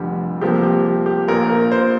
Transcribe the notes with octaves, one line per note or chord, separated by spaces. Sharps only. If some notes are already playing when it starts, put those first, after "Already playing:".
Already playing: F1 F2 D3 G3 G4
C2 C3 F3 A#3 G4
G4
G4
G4
A#1 A#2 A#3 A#4
A#4
C5